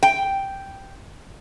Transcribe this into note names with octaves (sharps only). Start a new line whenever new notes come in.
G5